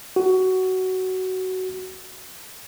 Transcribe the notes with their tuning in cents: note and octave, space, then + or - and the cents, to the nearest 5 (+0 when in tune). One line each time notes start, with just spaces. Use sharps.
F#4 +15